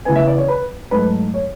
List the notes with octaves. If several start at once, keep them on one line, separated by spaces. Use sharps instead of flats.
C#3 E3 B3 G#5
E5
D5
C#5
B4
G#2 F#3 A3 B4
C#5